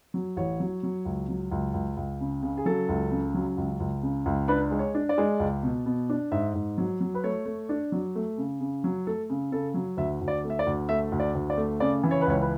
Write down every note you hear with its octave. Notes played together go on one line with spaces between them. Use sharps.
F#3
A1 C#5
F#3
F#3
C#2
F#3
C#2
C#2
C#2
C#3
C#3
G#4
F#3 A4
C#2
C#3
F#3
C#2
C#2
C#3
C#2
D4 B4
G#3
C#5
D4
D5
G#3
C#2
B2
B2
D4
G#2 E5
G#2
F#3
F#3
B4
A3 C#5
A3
D4
F#3
A3
C#3
C#3
F#3
A3 A4
C#3
C#3 A4
F#3
D2 E5
D2
D5
A3
E5
D5
D2
A3 E5
D2
D5
D2
D5
A3
C#3 D5
E3
C#5
B4
C#2 C#5
B4